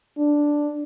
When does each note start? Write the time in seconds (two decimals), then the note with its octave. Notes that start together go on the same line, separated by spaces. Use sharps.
0.17 D4